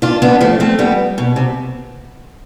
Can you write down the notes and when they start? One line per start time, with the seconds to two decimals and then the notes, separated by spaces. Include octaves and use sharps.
0.02 D4 F4
0.22 B3 D4
0.41 F3 A3
0.60 A3 C4
0.79 G3 B3
1.18 B2
1.36 C3